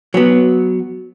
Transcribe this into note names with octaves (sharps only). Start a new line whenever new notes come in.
F#3 B3